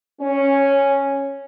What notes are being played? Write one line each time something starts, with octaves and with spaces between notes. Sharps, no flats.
C#4